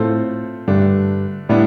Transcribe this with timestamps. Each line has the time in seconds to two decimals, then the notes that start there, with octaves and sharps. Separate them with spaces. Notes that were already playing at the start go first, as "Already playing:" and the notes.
Already playing: A2 A3 C4 F4 A4 C5
0.68 G2 D3 A3 D4
1.49 A2 G3 B3 D4